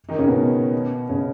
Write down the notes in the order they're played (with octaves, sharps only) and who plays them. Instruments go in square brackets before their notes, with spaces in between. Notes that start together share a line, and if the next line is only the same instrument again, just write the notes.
[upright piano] D#3 D#4
C#3 C#4
B2 B3
C#3 C#4